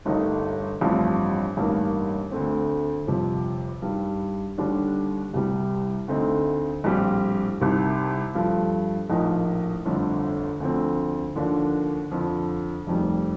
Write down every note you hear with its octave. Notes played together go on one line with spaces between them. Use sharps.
G1 G2 D#3 A3 D#4
A1 G2 F3 C4
A1 G2 D#3 A#3
D2 D3 A3 C4
G1 F2 C3 F3
G2 D#3 G3
D#2 D3 G3 D4
C2 C3 G3
D2 D3 A3 C4 D#4
A#1 A2 G3 C4
C2 C3 D#3
G2 F3 A3
A#1 A2 F3 A#3 D#4
G1 F2 D3 F3 A3
D2 D3 F3 C4
D#2 D3 F3 A#3 D4
F2 D3 F3
F1 F2 D#3 G3